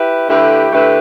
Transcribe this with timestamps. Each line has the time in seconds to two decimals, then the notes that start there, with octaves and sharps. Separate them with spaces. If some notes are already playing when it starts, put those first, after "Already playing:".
Already playing: E4 G4 B4
0.28 D3 A3 E4 G4 B4
0.72 D3 A3 E4 G4 B4